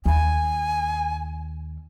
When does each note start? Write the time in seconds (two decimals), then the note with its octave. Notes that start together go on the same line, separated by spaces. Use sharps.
0.06 D#2 G#5